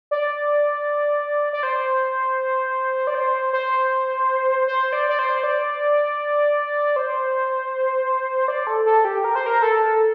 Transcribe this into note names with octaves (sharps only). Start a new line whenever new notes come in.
D5
D5
C5
D5
C5
C5
C5
D5
D5
C5
D5
C5
D5
A4
A4
G4
A#4
C5
A#4
A4